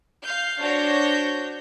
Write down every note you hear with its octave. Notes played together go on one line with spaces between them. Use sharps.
F5 G6
D4 F#4 C5 C#5 G6 A#6